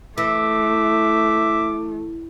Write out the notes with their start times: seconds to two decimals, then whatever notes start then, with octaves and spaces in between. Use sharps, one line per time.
0.18 E3 A3 E5 D6